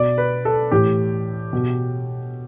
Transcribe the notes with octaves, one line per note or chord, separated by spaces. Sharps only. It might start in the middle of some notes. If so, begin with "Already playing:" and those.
Already playing: B2 D5
B4
A4
A2 E3 G4
B2